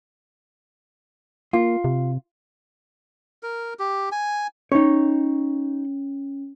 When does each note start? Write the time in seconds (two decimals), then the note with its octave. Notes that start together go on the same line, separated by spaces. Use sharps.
1.53 A#3 F4
1.84 C3
3.43 A#4
3.79 G4
4.12 G#5
4.72 C#4 D#4 C#5